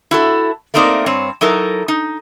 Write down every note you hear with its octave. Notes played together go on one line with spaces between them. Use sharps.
E4 F#4 A4
A3 A#3 C4 D#4 A#4 D5
G2 C4 C#5
F#3 D#4 E4 A4 A#4
D#4